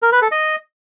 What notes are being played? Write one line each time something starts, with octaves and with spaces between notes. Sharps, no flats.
A#4
B4
A4
D#5